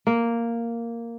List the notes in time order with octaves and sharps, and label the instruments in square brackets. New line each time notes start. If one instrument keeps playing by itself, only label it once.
[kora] A#3